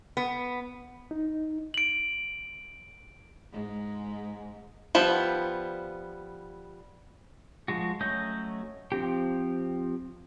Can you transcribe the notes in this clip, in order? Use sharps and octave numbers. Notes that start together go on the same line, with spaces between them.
B3
D#4
D7 F#7
G#2 G#3
F3 G3 B3
F3 G#3 F#4
F#3 A3 C#4 D#5 G6
F3 C4 G4